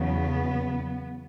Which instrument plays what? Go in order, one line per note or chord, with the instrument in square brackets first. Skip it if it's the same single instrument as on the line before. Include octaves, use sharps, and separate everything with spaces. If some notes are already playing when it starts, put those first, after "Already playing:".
Already playing: [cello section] E2 C#3 F#3 B3